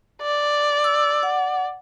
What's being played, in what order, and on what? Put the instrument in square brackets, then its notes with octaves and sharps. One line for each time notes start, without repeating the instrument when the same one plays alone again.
[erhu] D5
[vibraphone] E6
F#5